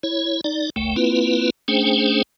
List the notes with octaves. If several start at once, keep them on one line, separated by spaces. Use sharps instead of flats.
E4 C#5
D#4 D5
F#1 C#2 A3 G5
A#3 C4 E4 F4 B4
A3 C#4 D4 G#4 C5 G5